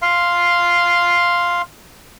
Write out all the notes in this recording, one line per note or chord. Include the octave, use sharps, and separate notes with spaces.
F5 C6